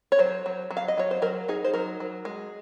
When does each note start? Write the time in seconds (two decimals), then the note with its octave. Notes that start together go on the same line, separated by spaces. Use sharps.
0.12 C#5
0.19 F#3 C5
0.46 F#3
0.71 F#3
0.77 F5
0.88 D#5
0.97 F#3 C#5
1.11 C5
1.22 F#3 A#4
1.48 D#4 G#4
1.65 C5
1.74 F#3 A#4
2.00 F#3
2.25 G#3